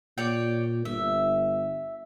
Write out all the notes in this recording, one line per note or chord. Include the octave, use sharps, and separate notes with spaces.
A#2 C#5 D5 G5
G1 E5